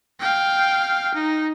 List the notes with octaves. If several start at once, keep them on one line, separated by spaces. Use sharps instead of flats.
F5 G5
D#4